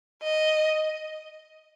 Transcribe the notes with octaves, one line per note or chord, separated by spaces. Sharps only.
D#5